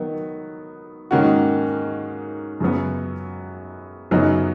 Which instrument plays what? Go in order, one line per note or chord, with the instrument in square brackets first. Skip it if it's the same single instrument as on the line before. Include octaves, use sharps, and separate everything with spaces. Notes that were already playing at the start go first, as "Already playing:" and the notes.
Already playing: [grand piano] D#3 F#3 B3
G#2 D#3 A#3 C#4 F#4
F#2 C#3 F#3 B3
F#2 C#3 F#3 B3 D#4